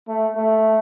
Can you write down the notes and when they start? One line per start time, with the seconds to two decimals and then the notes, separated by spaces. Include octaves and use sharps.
0.08 A3
0.36 A3